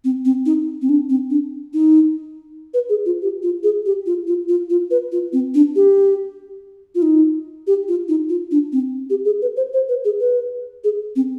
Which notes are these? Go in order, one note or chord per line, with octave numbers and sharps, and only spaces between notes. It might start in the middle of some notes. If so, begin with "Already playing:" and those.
C4
C4
D#4
C4
D4
C4
D4
D#4
B4
G#4
F4
G4
F4
G#4
G4
F4
F4
F4
F4
B4
F4
C4
D4
G4
F4
D#4
G4
F4
D#4
F4
D4
C4
G4
G#4
B4
C5
C5
B4
G#4
B4
G#4
C4